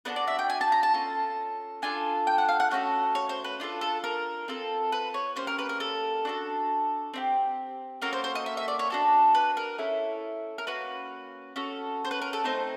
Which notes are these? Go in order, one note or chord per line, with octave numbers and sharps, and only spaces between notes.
B3 D4 F#4 A4 B4
D5
E5
G5
G#5
A5
A#5
A5
C#4 F4 A4
D4 F4 A4 G#5
G5
F#5
F5
F#5
A3 C#4 F#4 A4 C#5
C#5
C5
B4
D4 F4 A4
A4
A#4
C4 F4 A4
B4
C#5
A#3 C#4 G4 C5
A#4
B4
A#4
A4
D4 F#4 A4
C4 E4 G4
A#3 C#4 F#4 A4 A#4
C5
C5
D#5
E5
E5
D5
C#5
D4 F#4 A4
B4
A#4
C#4 E4 A4
A#4
A#3 C#4 F#4 B4
C#4 F#4 A4
C5
B4
A#4
A4
A3 C4 D#4 C5